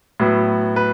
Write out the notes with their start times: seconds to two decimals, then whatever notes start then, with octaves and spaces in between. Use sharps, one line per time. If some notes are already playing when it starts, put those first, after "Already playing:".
0.20 A2 F#3 B3
0.76 B4